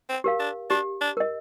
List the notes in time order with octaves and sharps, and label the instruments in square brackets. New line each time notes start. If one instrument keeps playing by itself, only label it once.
[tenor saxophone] C4
[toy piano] G4 A#4 F5
[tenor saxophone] D4
[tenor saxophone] D4 [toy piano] G4
[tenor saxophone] D4
[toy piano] A#4 D#5